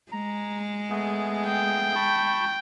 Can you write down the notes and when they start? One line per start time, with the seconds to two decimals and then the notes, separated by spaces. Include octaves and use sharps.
0.12 G#3 A#5
0.90 A3 B3 G#4
1.46 G5
1.95 A5 B5 C#6